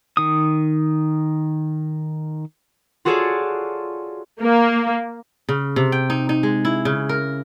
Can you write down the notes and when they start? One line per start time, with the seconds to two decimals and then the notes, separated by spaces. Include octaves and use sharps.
0.17 D#3 D#6
3.05 F4 F#4 G#4 A4 C#5 D5
4.41 A#3
5.49 C#3
5.76 C3
5.92 G5
6.10 D#4
6.29 D#4
6.43 G#3
6.65 E4
6.85 C#3
7.09 A#4